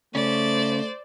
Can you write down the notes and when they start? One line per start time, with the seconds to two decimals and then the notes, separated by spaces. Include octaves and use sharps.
0.15 C#3 A3 C#4 C5 D5